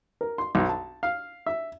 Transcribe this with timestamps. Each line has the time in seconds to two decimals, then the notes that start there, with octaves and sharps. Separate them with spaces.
0.21 A#4
0.38 C6
0.55 B1
0.69 A5
1.03 F5
1.46 E5